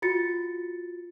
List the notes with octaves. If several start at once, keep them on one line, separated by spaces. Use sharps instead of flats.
F4 F#4 A6 C#7